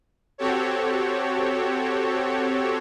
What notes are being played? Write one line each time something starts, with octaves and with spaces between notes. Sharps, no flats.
C4 F#4 G4 A4 C#5